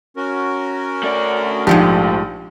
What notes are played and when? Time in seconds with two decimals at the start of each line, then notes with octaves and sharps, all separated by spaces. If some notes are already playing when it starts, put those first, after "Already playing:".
0.17 C#4 F#4 A#4
1.03 A3 D5
1.67 A#1 G#2 F3 G4